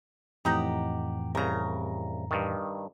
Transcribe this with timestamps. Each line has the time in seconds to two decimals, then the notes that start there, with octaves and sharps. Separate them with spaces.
0.45 F2 A2 E3 D#4 G4 F#5 A#5
1.35 C2 C#3 A#4 A#5
2.31 G2 D#3